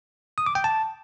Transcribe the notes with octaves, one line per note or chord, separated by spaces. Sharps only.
D#6
D6
G5
A5